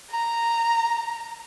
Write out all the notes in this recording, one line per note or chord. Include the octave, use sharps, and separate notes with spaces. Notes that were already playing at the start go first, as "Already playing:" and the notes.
A#5